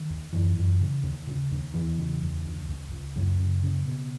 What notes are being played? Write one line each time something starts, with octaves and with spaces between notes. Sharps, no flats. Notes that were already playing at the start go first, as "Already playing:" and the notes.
Already playing: D#3
D#2
F#2 E3
F#2
C#3
D#2
C#3
D#2
E2 E3
C#3
E2
C#2
C#2
C#2
F#2 C#3 F#3
C#3
C#3
B2